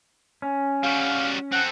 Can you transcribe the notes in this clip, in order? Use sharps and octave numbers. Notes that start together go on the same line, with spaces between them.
C#4
G3 F#4 F5
C4 A4 F#5